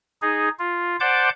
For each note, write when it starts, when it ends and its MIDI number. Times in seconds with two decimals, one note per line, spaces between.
0.22 0.49 63
0.22 0.49 68
0.59 0.96 65
1.00 1.29 72
1.00 1.29 74
1.00 1.29 78
1.00 1.29 81
1.00 1.29 86
1.00 1.29 91